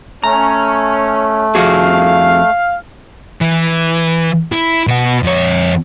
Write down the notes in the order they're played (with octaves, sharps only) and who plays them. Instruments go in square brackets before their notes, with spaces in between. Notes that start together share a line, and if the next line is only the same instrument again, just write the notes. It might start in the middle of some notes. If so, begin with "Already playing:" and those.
[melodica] A3 [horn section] C#4 [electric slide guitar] A#5
[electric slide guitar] F2 F#4 G#4 [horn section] F5
[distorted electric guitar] E3
E4
B2 F#4
F2 C#5